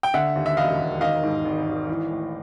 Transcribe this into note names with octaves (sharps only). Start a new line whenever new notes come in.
G5
D3 E5 F#5
D#2
E5
E1 D#5 F5
E1
D#3 D#5 F5
G#2
G#1
G#1
E3
A2